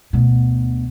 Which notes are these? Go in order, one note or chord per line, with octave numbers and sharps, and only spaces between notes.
D2 B2